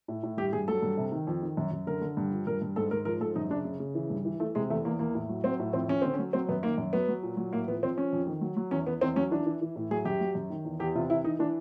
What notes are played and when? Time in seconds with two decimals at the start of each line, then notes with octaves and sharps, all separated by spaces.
0.08 A2
0.23 A2
0.37 G2 G4
0.53 G2 G#4
0.68 F#3 A4
0.82 G2
0.97 C3
1.12 D#3
1.27 F2
1.42 D#3
1.57 F#2
1.71 F#2
1.87 D3 A#4
2.01 D3
2.17 G2
2.31 F3
2.47 G2 A#4
2.62 G2
2.76 G#2 A4
2.91 G#2 A#4
3.05 F3 A#4
3.20 G#2 A4
3.35 F#2 D#4
3.50 C#3 D4
3.65 C#3
3.80 C#3
3.95 E3
4.10 G2
4.25 E3
4.40 E3 A3
4.55 C3 G#3
4.70 E2 A3
4.85 E2 A#3
4.99 E2 A#3
5.15 A2
5.29 F#3
5.44 F#3 C4
5.60 A2
5.73 F2 C4
5.88 F2 C#4
6.02 D3 C4
6.14 C#4
6.19 F#3
6.33 F#3 C4
6.49 F#2 B3
6.63 D#3 A#3
6.78 F#2
6.93 F#3 B3
7.08 F#3
7.23 A#2
7.37 F#3
7.53 A2 A#3
7.68 F3 B3
7.83 F3 C4
7.97 F3 C#4
8.13 F2
8.27 D#3
8.41 F#3
8.57 F#3
8.71 E2 C#4
8.86 E2 B3
9.01 E2 C4
9.16 F#3 C#4
9.31 E3 D4
9.46 E3
9.61 E3
9.76 A2
9.91 F#3 G#4
10.05 F#2 G4
10.20 F#3
10.35 F#2
10.50 D#3
10.65 E2
10.80 E2 G4
10.95 C3 F4
11.10 E3 E4
11.24 E3 D#4
11.39 E3 D4